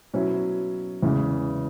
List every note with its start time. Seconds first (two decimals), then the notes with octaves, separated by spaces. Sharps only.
0.14 B2 F#3 C#4 E4
1.02 E2 C#3 E3 G#3